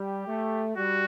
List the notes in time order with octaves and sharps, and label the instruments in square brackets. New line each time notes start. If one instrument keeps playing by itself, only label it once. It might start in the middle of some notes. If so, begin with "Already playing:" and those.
Already playing: [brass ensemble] G3 [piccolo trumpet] G4
[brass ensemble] A3
[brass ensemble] G3 [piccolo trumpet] F#4